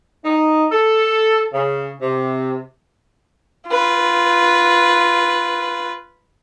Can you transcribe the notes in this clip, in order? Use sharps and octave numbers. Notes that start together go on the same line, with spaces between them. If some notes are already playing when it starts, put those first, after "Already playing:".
D#4
A4
C#3
C3
F4 B4